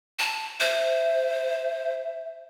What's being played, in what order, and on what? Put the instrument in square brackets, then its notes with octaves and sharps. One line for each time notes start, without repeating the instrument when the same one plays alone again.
[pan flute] A5
[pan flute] C5 [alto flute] E5